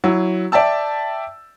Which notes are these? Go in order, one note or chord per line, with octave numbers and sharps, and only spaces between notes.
F#3 E4
D5 E5 G5 A5 E6